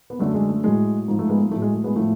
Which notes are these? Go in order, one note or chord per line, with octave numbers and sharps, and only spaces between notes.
B3
F#2 D3 F#3 A3
G#3
A3
A2 F#3 G#3
G#2 F3
A3
G#3 B3
A3
A2 F#3 A3
G#3
A3
G#3 B3
A2 F3 A3